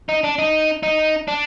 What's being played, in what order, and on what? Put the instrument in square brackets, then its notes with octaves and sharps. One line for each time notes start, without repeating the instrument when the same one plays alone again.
[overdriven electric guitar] D#4
D4
D#4
D#4
D4